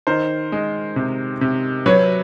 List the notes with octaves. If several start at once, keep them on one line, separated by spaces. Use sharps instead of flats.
D#3 A#4 C5
G#3
C3
C3
F#3 B4 C#5